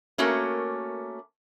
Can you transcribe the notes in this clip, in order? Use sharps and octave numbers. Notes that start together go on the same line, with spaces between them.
A3 A#3 C#4 F#4 A#4